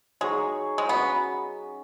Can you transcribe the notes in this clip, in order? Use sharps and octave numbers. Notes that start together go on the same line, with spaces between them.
F#3 G#3 D#4 G#4 C#5
G#3
F#3 B3 C#4 F#4